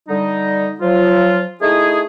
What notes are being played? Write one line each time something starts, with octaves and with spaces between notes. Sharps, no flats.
D3 G3 D#4
F3 F#3 F4
A3 D#4 E4 G#4